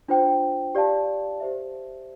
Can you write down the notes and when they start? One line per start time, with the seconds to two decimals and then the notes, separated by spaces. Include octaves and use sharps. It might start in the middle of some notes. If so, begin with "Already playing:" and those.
0.08 D4 F4 C5 G5
0.75 G4 D5 F5 A5
1.40 G4 C5 E5